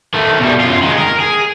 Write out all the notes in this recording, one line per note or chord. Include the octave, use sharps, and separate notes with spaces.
D#3 A3
B2 G3
F#2 F4
D#3 G#3
A#4
G#4